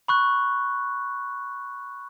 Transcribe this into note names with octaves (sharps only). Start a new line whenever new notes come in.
B5 C#6 F#6